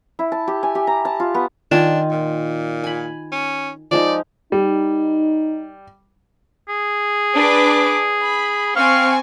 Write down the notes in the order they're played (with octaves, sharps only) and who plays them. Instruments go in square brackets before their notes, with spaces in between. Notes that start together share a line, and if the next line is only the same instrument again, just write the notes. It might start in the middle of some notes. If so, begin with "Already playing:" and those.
[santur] E4
A5
G4
G#5
G4
A#5
A5
F4
B3
[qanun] D#3 F4 G#5 [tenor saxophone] D4
[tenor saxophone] A#2
[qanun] G#5 B5
[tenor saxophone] C#4
[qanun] F3 G#3 D#4 [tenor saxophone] D5
[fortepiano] G3 [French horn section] D#4
[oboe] G#4
[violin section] D4 B4 D6
B5
[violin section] C4 G#5 C#6 [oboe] F5